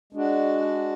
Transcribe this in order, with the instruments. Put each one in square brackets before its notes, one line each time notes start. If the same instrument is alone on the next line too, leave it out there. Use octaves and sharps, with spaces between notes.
[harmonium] G#3 D4 F#4